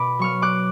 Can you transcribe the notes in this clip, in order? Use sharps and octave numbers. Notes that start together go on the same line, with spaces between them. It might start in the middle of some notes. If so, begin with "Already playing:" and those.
Already playing: B2 B5 D6
F#3 C#6 F6
D6 F#6